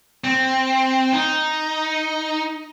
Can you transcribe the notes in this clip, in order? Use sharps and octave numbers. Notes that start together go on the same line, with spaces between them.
C4
D#4